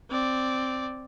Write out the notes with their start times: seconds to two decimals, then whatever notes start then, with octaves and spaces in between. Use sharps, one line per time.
0.11 C4 D5